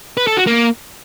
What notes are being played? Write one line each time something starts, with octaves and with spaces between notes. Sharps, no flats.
B4
A4
F#4
A#3